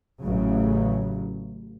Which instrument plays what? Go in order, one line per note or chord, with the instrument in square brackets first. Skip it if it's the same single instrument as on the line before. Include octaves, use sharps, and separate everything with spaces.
[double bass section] A1 C#3 F#3